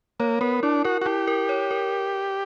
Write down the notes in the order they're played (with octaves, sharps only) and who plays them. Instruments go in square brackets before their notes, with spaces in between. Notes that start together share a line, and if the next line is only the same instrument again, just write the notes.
[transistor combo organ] A#3 [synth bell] C#5
[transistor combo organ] B3 [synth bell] A#4
[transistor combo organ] D4 [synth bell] E4
[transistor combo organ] F#4 [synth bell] A#4
[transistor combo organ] F#4
[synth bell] E4 [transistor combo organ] G4
[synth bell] A#4
C#5
A#4